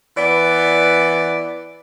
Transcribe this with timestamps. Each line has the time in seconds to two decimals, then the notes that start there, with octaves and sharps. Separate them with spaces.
0.16 E3 B3 D5